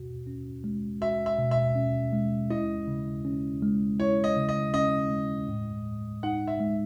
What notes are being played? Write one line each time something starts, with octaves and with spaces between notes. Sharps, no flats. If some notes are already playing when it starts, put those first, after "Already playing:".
Already playing: B2 F#4
C#4
G#3
F#4 E5
E5
B2
E5
C#4
G#3
E4 D#5
C#3
C#4
G#3
E4 C#5
D#5
C#3
D#5
C#4 D#5
G#3
A2
A2
D#4 F#5
E5
G#3